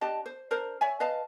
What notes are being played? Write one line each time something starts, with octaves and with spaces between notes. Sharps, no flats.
D4 G4 D#5 A5
C5
D4 A#4 C5
C#5 E5 G#5
B4 D#5 F5 A5